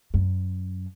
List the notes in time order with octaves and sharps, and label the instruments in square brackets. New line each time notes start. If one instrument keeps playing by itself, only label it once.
[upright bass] F#2